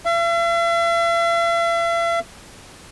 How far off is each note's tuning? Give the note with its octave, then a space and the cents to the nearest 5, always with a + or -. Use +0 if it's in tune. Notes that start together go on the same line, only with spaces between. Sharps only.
E5 +45